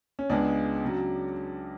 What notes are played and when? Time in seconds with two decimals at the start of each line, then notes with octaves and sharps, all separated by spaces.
0.19 C#4
0.30 C#2 C#3 G#3 B3 D4
0.85 C#3 F#3